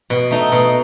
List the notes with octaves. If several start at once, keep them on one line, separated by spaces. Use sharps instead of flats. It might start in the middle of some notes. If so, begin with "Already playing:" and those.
B2
A3 D#4
B2